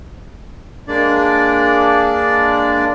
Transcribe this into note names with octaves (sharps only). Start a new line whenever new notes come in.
G#3 A#3 D4 D5